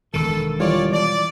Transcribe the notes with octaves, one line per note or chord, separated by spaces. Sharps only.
E1 D#3 A4
E3 G3 F4 C#5 D5
D5